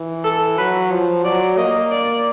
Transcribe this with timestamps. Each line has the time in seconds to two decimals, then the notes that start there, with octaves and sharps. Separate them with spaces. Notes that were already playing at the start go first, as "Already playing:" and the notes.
Already playing: E3
0.25 A4
0.58 F#3 B4
0.92 F3
1.24 F#3 D5
1.58 A#3 D#5
1.92 D5